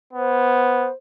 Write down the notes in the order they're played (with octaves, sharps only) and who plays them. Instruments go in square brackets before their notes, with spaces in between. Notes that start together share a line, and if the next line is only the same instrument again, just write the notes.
[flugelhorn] B3 [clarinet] C5